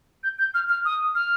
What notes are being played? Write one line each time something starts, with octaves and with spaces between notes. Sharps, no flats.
G6
G6
F6
F6
D#6
F6